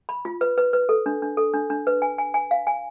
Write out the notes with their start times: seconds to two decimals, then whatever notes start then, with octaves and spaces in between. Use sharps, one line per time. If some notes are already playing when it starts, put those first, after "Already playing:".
0.09 B5
0.25 F4
0.41 B4
0.58 B4
0.73 B4
0.89 A4
1.06 D4
1.22 D4
1.37 A4
1.54 D4
1.70 D4
1.87 B4
2.02 G#5
2.18 G#5
2.34 G#5
2.51 F5
2.67 G#5